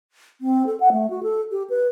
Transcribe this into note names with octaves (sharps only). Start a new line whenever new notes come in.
C4
A4
F#5
A3
F#4
A4
G4
B4